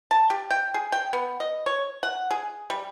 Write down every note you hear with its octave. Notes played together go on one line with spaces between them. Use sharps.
A5
G4
G5
G#4
G5
B3
D#5
C#5
F#5
G#4
G3